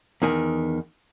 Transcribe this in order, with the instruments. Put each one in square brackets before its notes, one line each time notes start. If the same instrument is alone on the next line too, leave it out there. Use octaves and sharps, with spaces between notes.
[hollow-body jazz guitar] E2 D#3 G#5